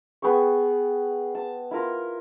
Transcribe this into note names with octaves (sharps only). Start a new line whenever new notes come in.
B3 G#4 G5 C#6
A5
E4 F4 A#4 C6